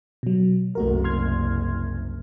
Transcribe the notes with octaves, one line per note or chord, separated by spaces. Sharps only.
B2 F#3
F#1 C2 A3 F#4 A#4
C6 F6 G#6